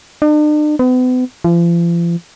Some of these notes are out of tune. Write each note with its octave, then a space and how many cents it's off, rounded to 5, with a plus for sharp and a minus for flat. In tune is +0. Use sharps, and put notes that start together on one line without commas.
D4 +45
B3 +40
F3 -40